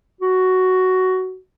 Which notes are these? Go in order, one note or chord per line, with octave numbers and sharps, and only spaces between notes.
F#4